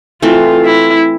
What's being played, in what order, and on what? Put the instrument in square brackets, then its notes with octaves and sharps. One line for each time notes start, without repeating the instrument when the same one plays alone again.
[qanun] E3 A3 C4 [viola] F4
[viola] E4